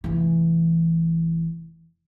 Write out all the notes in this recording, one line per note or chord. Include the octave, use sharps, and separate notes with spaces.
F1 E3